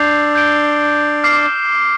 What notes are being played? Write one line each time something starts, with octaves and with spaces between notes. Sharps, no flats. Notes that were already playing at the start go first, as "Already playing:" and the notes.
Already playing: D4 E6 G6 C7 F7
G6 D7 G7
D6 F6 C7